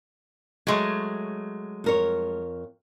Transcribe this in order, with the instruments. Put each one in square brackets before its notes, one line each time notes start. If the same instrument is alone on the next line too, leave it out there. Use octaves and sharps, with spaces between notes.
[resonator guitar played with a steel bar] F#3 G#3 A3 [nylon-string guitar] C#5
[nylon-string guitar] F2 A#4 C#5